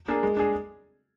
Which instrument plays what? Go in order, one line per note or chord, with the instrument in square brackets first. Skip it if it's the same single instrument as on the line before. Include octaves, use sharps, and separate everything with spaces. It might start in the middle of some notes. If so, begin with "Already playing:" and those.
[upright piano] A#3 D4 G#4
G#3
D4 G#4